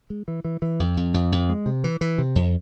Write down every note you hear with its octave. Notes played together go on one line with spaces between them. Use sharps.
G#3
E3
E3
E3
F2
F2
F2
F2
G#3
C3
E3
E3
C3
F2